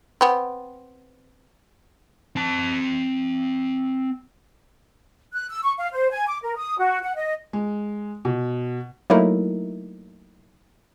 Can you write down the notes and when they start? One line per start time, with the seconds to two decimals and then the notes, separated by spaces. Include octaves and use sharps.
0.21 B3 C4
2.36 C4 A5
5.32 F#6
5.49 E6
5.62 C#6
5.78 F5
5.92 C5
6.11 G#5
6.27 D6
6.43 A#4
6.57 D#6
6.78 F#4
7.02 F#5
7.15 D#5
7.53 G#3
8.25 B2
9.10 F#3 A3 A#3 D#4 E4 A#4